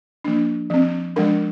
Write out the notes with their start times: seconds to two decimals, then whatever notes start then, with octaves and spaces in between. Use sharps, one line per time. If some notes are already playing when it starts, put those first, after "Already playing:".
0.24 F3 A#3 D4
0.70 F3 C4
1.16 F3 G#3 D4 A#4